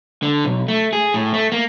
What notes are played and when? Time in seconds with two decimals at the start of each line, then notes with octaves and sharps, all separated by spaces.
0.23 D3
0.45 B1
0.68 A3
0.93 G#4
1.14 A2
1.34 A3
1.52 A#3